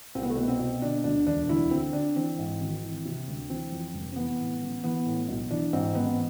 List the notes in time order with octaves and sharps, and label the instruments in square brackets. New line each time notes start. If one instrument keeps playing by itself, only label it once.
[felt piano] C2 C4
B3
A3
B2 B3
C4
B2
D3 D4
D2 D4
E1 D4
D2 E4
D3 C4
D3 D4
E3 C4
G#2
G#1
E3
C3
D2
E3 C4
F2
F1
C4
E3 B3
A2
A1
E3 B3
A2
B1
E3 D4
G#2 C4
A1 B3